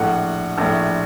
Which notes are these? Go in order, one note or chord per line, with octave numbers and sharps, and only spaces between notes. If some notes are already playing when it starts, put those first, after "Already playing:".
Already playing: A#1 A2 F#5
A#1 A2